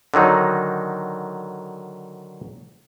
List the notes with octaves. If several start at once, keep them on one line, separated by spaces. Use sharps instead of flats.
D3 D#3 F#3 D#4